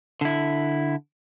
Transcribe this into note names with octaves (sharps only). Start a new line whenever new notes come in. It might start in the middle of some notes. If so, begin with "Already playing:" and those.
D3 E4